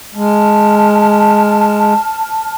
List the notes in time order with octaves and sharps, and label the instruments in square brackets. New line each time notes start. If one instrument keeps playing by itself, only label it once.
[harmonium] G#3 [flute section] A5 F6